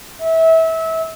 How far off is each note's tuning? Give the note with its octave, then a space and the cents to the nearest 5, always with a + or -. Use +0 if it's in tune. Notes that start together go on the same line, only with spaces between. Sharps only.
E5 -25